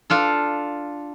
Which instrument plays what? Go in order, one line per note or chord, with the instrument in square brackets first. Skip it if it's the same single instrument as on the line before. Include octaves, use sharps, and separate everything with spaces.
[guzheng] D4 F4 A4